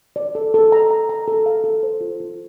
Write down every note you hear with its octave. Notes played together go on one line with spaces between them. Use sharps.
D5
A4
A4
A#5
A#5
A#5
A4
F5
A4
C5
F4
F4